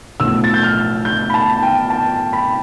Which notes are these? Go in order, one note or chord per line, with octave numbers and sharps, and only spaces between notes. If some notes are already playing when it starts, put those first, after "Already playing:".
B1 A2 F3 E6
A6
G6
F6
G6
B5
A5
G5
A5
B5